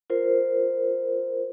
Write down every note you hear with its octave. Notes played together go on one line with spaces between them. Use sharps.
F4 A#4 C5